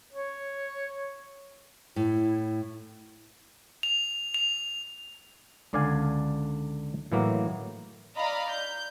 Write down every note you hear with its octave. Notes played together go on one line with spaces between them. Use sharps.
C#5
A2 E4
F7
F7
C#2 D3 D5 F5 G#5
A2 E3 F#3 A#3
D5 D#5 F5 A#5 B5
G6